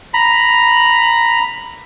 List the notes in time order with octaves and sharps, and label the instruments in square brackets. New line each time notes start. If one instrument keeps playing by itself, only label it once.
[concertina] A#5 B5